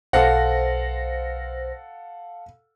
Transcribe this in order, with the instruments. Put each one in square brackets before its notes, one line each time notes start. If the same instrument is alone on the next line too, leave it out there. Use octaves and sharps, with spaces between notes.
[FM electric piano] B1 C5 A#6 [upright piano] A4 F5 F#5